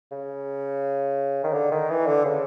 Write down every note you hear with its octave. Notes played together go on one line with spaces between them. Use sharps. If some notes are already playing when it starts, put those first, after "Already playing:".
C#3
D#3
D3
D#3
E3
D3
C#3